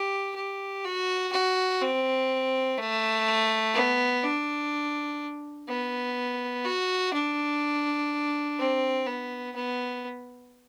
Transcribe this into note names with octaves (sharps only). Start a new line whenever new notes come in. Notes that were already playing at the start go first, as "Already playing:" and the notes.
Already playing: G4
G4
F#4
F#4
C4
A3
B3
D4
B3
F#4
D4
C4
B3
B3